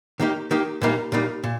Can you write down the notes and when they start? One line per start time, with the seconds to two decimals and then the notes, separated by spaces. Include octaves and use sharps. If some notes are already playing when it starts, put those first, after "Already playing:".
0.20 D#3 A#3 D#4 G4
0.51 D#3 A#3 D#4 G4
0.82 A#2 G3 A#3 D#4
1.12 A#2 G3 A#3 D#4
1.44 A#2